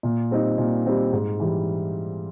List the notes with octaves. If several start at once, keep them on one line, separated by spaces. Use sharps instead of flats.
A#2
G3 C4 D#4
A#2
G3 C4 D#4
G#2
E3 G3